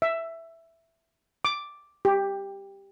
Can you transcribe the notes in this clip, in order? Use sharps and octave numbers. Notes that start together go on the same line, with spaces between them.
E5
D6
G4